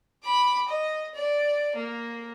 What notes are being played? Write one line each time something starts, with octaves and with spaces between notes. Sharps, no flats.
B5 D6
D#5
D5
A#3